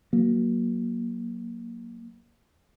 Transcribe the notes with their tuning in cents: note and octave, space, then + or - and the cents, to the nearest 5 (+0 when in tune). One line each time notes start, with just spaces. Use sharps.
F#3 +0 A#3 +10